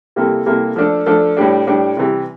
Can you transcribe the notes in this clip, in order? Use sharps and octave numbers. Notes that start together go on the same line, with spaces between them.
C3 G3 A#3 E4 A4
C3 G3 A#3 E4 A4
F3 A3 D4 A4
F3 A3 D4 A4
A2 G3 D4
A2 G3 D4
C3 E3 G3